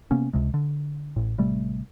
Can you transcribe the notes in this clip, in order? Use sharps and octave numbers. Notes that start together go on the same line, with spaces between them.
C3 A#3 B3 C#4
C#2 C3 G#3
D3
A1 A2
A1 C3 G3 A3